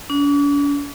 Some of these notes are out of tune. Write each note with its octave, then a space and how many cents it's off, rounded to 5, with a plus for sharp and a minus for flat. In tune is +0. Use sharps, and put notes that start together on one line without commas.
D4 -45